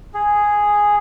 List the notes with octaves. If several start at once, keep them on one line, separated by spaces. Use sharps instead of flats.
G#4